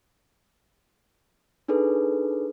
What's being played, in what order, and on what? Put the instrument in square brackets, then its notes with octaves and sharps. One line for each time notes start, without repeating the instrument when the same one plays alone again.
[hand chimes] D4 D#4 G#4 A4 B4